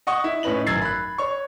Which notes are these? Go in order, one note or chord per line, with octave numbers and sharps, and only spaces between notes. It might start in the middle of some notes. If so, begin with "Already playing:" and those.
D#5 F#5 C#6 D#6
E4
A2 C#4 D#4 B4 D#5 F#7
G#1 F#2 E6 G#6 A6 C7
B5 F#6
C#5 C#6